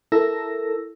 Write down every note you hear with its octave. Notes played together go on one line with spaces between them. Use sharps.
E4 A4 A#4 E6 A#6